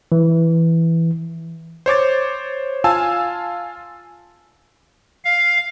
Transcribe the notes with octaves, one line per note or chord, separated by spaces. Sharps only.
E3
C5 C#5 D6 A6
F4 F5 G#5 A5 E6
F5